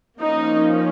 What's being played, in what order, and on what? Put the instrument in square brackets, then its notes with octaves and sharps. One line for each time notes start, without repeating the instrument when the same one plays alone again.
[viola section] F3 A#3 C#4 D#4